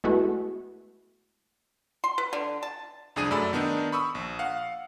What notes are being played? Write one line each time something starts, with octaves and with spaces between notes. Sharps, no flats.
G#3 A3 B3 E4 F#4
C6
B4
D3
A5
C2 F2 D4 G#4 D#6 D#7
F#2 A3 D5 B5 E6
D#3 B3 D4 D#4
B5 C#6 D#6 E6
A#1
F5 F#5